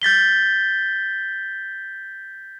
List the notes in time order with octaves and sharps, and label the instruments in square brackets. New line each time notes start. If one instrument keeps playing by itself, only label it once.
[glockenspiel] G6 A6 B6 G7